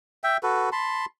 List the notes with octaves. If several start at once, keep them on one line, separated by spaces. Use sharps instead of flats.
E5 G5
F#4 A4 B4
A5 B5 C6